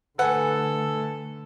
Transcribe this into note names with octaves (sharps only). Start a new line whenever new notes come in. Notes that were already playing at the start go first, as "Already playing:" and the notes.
D3 A3 A4 B4 F#5 G#5